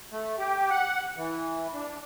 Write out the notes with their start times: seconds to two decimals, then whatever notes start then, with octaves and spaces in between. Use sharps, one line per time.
0.12 A3
0.39 G4
0.70 F#5
1.17 E3
1.74 D4